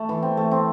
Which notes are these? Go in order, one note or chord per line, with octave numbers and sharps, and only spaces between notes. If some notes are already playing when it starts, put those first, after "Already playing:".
Already playing: A3 A4
E3
C4
A3
C4